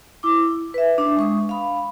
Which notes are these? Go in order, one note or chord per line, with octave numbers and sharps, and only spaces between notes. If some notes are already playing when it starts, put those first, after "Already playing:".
E4 D6
B4 E5
D4
G#3 C#6 D#6
F5 B5